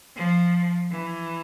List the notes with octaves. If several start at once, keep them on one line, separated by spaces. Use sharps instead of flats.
F3
E3